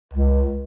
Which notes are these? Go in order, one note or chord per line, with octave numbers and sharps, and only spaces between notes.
C#2